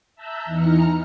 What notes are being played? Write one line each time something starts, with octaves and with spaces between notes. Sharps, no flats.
E5 A5 A#5 E6 F#6 G6
E2 E3 D#4 A#5 F6 C#7